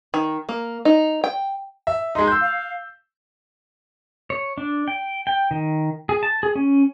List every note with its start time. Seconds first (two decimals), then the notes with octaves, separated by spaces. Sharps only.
0.14 D#3
0.49 A#3
0.85 D#4
1.24 G5
1.87 E5
2.15 G#3 D#4 C6
2.27 E6 G6
2.41 F5
4.30 C#5
4.58 D4
4.88 G5
5.27 G5
5.51 D#3
6.09 G#4
6.23 A5
6.43 G#4
6.55 C#4